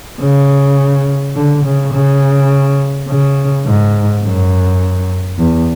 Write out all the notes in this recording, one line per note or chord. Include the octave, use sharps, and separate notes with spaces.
C#3
D3
C#3
C#3
C#3
G#2
F#2
E2